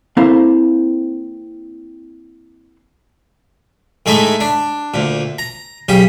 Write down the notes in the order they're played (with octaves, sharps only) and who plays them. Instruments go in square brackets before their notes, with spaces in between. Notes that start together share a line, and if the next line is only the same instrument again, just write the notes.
[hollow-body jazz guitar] A#3 C4 E4 A4 C5 F5
[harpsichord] A2 G#3 A3 D#4 E4
D4
D2 A#2
A#5
B1 C#3 G4